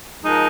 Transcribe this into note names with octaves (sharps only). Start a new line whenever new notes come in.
F3 G#3 D#4 A#4